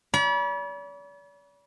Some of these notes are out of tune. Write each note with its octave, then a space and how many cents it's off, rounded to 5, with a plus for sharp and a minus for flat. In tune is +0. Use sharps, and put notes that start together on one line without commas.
D5 -45 B5 -35